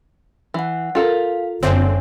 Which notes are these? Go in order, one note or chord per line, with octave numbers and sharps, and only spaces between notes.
E3 E5 F#5
F4 A4 A#4 F5
F#1 D3 C4 C#5 E5 G#5